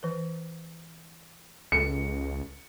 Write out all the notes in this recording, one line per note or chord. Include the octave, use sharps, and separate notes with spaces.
E3 B4
C#2 A4 C#7